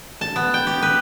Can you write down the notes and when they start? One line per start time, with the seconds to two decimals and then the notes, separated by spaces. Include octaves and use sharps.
0.21 A5
0.36 B3
0.54 G5
0.67 G4
0.82 B4